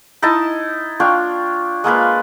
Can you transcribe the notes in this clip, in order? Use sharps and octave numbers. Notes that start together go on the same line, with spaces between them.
D#4 E4 D#5 A5
D4 F4 C#5 G5
G#3 A#3 F4 B4